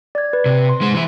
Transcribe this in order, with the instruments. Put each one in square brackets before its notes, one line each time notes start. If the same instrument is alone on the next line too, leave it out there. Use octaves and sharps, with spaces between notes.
[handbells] D5 G#6
B4
[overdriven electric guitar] C3
[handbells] C6
[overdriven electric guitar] G#3 C5
E3 E4